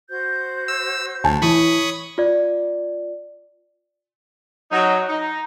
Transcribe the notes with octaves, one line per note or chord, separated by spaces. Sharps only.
F#4 C5 G6
E6
D2 G#5 A5
E3 C#5 B5 C#6 D#6
F4 D5
F#3 D#4 F#4
D#4